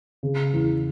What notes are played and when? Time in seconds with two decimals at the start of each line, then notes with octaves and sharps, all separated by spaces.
0.23 C#3
0.53 E2